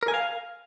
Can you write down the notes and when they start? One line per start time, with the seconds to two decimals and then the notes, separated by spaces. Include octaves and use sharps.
0.03 A#4
0.08 G#5
0.14 F5